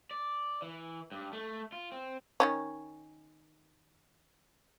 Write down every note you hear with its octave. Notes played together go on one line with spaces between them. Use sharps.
D5
E3
G2
A3
F4
C4
D#3 E3 C#4